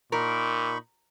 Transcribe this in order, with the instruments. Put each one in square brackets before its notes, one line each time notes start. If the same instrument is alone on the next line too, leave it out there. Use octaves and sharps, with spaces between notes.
[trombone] A#2 [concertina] D#4 B5 C#6 [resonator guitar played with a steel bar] A#4